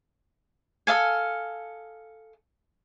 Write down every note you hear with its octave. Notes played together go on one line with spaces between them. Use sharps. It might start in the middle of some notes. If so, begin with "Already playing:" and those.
A4 D#5 F5 G#5